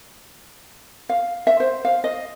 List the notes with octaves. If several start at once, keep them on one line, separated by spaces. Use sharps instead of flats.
F5
E5
C5
F5
D#5